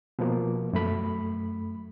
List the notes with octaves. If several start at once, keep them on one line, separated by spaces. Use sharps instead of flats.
B2 F3 A#3
F#2 A3 B5